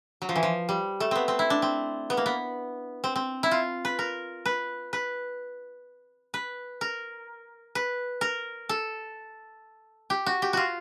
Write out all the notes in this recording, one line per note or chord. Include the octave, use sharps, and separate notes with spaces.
F#3
F3
E3
F3
G3
A3
B3 C4
C4
E4
D4
C4
B3
A#3
B3
C4
C4
E4
F4
B4
A#4
B4
B4
B4
A#4
B4
A#4
A4
G4
F#4
G4
F4 F#4